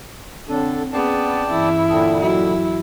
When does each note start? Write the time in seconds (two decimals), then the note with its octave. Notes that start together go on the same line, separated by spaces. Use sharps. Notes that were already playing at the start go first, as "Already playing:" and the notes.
0.49 D3 C4 D4 A4 C#5 G5
0.93 B3 C#4 G#4 D5 G5 A5
1.51 G2 E3 E4
1.89 A#2 D3 G5 A5 D#6
2.20 F#3 E4 F#4 D#5